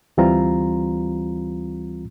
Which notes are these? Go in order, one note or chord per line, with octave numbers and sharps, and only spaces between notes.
D2 E3 G3 C4 F4 A#5